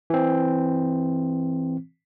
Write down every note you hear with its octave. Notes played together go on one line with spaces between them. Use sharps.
E3 C4